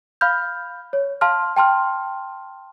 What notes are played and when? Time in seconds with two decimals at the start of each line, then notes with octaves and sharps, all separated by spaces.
0.21 F5 B5 F6 G6
0.93 C#5
1.21 F5 A5 C6 F6
1.56 G5 A5 C6 F6